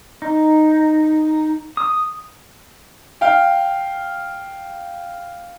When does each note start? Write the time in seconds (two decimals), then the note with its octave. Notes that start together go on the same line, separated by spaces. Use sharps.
0.22 D#4
1.77 D#6
3.21 F5 G5